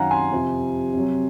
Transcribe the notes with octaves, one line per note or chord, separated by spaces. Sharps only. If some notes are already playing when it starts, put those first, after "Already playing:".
Already playing: F#2 D#3 F#3 F5 F#5 G#5 A#5
G#5 C6
F2 C3 F3
C3 F#3